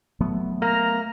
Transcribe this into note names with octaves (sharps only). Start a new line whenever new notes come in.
F#3 A3 B3
A#3 A#5 F6